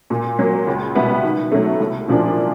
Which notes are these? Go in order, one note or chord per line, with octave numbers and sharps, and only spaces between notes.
A#2
F#3 A#3
C#2
B2 G3 B3 E4
D#3
F#3 A3
C2
A#2 F3 A#3 D4